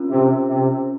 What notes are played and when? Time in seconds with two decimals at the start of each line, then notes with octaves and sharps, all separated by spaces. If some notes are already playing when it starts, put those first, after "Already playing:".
Already playing: C#4 F4 A#4
0.10 C3
0.49 C3